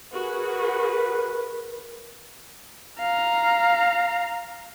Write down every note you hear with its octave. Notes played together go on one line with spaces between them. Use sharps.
F#4 G#4 A#4 B4
F5 A#5